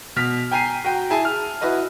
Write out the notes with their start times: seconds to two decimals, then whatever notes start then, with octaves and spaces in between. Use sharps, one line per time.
0.16 B2 F#4 F6 B6
0.51 G5 G#5 A#5 C7 D#7
0.84 F#4 G5 A#5
1.10 E4 G#4 G#5 A5
1.25 F6
1.61 E4 F#4 B4 D#5